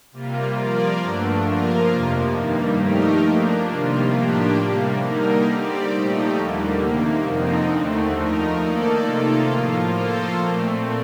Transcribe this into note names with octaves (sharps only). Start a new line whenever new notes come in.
C3 G3 A#3 F4
F3 A#3 F4 A#4 D5
G2 D3 A3 D4
F3 A#3 F4 A#4
F2 C3 F3 A#3
G2 D#3 G3 A#3
F3 A3 D#4 G4 A#4
F3 A#3 D4
C3 D#3 G3 A#3 F4
A2 F3 A#3 D4 G4
C3 G3 A#3
D3 G3 A#3 D#4 A#4
G3 C4 G4 D5
A#2 F3 A3 D#4 G4
D#2 D3 G3 A#3
C3 D#3 A#3
F2 D3 F3 C4 D#4
D#2 D3 A3 C4
F3 A3 D#4 A#4
D#3 A#3 D#4 A4 D5
C3 D#3 A#3 F4 A4
A2 F3 A#3 F4
F3 A#3 F4 A4 C5
A#2 A3 C4